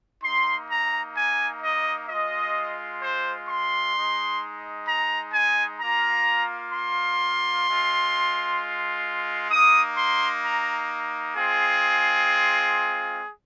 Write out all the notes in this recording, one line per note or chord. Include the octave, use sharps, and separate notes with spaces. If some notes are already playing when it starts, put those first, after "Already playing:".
A#3 D#4 C6
A#5
G#5
D#5
G#3 F4 D#5
C5
C6
G#3 D#4
A#5
G#5
A#3 F4 A#5
C6
G#3 F4
A#3 D#4 D#6
C6
A#5
G#3 C4 F4 G#4